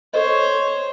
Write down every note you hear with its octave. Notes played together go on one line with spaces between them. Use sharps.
A4 C5 C#5 D#5